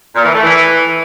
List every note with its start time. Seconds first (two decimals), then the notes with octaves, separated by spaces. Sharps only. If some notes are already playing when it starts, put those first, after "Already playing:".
0.15 A#2
0.25 E3
0.34 A3
0.43 E3